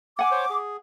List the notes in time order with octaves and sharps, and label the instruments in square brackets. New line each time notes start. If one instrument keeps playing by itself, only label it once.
[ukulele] F#5 G#5 [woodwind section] D6
[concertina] C5 C#5
G#4